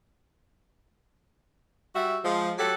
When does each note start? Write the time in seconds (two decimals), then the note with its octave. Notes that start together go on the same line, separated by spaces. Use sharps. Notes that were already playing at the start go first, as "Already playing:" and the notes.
1.95 G3 F#4 E5
2.24 F3 G#3
2.58 F#3 G4 A4 F#5